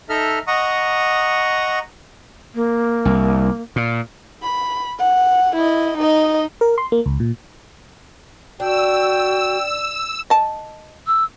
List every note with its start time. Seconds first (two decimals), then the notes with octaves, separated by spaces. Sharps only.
0.10 D#4 A4 D#5 E5 F6
0.47 D#5 F#5 A#5 C#6 D#6
2.54 A#3
3.05 C2
3.76 A#2
4.42 B5
4.99 F#5
5.55 E4 D#5
5.98 D#4 D#5
6.61 A#4
6.78 C6
6.92 A#3
7.06 C#2
7.20 A#2
8.60 D4 F#4 G5 E6
10.30 D#5 A5
11.07 E6